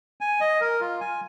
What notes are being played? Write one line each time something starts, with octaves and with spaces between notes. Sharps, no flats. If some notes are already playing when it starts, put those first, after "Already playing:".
G#5
D#5
A#4
F4
G#5